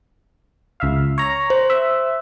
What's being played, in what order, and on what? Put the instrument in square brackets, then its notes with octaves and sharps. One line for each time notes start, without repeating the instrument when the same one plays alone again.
[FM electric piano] C#2 E5 F5
C#5 A#5
[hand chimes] C5
[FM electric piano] E5